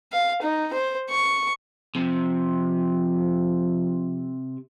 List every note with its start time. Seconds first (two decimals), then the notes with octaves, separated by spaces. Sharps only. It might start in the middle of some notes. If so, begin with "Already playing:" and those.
0.13 F5
0.42 D#4
0.73 C5
1.10 C#6
1.96 C3 F3